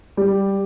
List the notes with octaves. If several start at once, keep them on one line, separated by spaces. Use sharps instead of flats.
G3